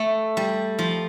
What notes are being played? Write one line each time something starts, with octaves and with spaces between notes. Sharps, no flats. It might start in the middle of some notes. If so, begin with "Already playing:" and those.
Already playing: A3
G3
F3